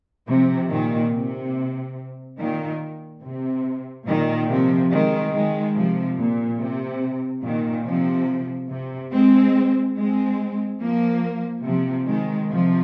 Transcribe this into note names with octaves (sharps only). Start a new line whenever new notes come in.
C3 F3
A#2 D#3
C3
A#2 D#3
C3
A#2 D#3
C3 F3
D#3 G#3
D#3 G#3
C3 F3
A#2
C3
A#2 D#3
C3 F3
C3
G#3 C4
G#3 C4
F3 A#3
C3 F3
D#3 G#3
C3 F3